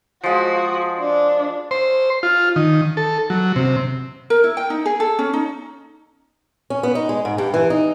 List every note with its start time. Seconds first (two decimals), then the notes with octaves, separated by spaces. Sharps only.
0.24 F3 G#3 F#4
0.99 D4
1.71 C5
2.23 F4
2.56 D#3
2.97 A4
3.30 F#3
3.56 C3
4.30 A#4
4.44 E4
4.57 G5
4.70 D#4
4.86 G#4
5.00 A4
5.19 C#4
5.33 D#4
6.70 C#4
6.83 B3
6.95 D#4
7.09 G#3
7.25 G#2
7.38 G2
7.54 E3
7.70 D#4